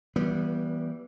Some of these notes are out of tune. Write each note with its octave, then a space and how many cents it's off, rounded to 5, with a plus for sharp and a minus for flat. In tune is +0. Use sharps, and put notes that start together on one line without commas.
E3 +0 G3 -15 B3 -30